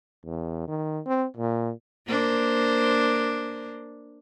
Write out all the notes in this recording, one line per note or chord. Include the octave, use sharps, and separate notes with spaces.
E2
D#3
C4
A#2
A#3 D4 C5